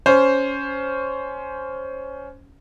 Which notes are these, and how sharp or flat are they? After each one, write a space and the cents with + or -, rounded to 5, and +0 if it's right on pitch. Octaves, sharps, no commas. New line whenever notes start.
C#4 +10 C5 +0